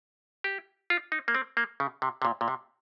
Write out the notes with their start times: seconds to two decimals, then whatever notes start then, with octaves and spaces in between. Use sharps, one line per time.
0.44 G4
0.90 F4
1.12 D#4
1.28 A#3
1.35 C4
1.57 A#3
1.80 C#3
2.02 C3
2.22 C3
2.25 A#2
2.41 A#2
2.48 C3